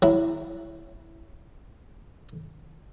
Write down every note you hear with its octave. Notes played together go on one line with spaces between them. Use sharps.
F#3 E4